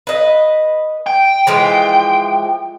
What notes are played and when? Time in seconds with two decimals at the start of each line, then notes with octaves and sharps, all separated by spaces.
0.07 B4 D#5
1.06 G5
1.47 E3 F3 G#3